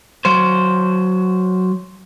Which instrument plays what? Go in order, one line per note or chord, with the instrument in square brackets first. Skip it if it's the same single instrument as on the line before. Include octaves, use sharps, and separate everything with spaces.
[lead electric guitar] F#3 C5